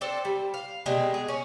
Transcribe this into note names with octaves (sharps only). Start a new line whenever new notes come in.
C4 D4 A4 C5
G3
F5
B2 G3 G#3 C4
G#4
C#4